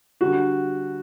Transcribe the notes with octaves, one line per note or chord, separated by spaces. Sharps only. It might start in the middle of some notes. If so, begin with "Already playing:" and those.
D3 G3 F#4